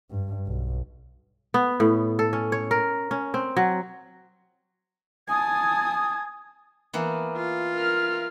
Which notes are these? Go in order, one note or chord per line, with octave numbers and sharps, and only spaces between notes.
G2
B1
B3
A2
A4
C#4
C#5
A#4
C#4
C4
F#3
G#5 A5 D#6 G#6
E3 A#3 B3
F4
A#4 F6